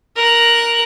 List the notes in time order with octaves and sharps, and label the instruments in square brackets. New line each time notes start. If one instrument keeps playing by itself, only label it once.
[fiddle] A#4 F#6